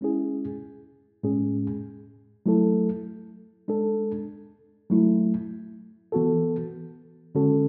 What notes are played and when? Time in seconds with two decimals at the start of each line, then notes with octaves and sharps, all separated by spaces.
0.01 G#3 C#4 E4 G#4
1.23 A2 G#3 C#4 G#4
2.46 F#3 A3 E4 A4
3.68 G#3 D4 A4
4.90 F#3 A3 E4
6.12 E3 B3 F#4 A4
7.35 D3 G#3 C#4 F#4 A4